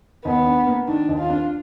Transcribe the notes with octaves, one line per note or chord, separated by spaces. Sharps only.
D#2 B3
D4
A#3
D#3 D4
D#2
F4
D4